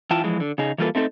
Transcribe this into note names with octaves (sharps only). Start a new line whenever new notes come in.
E3 E4 F4 G5 A5
E3 F3 G#3
D3
C#3 D#4 G#4
E3 G3 A#3 F4 A4 B4
A3 C4 D#4 G#4 A4